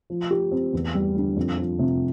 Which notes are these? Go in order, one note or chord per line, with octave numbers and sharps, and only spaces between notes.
F3
G4
C4
E2
G3
D3
F2
F3
C3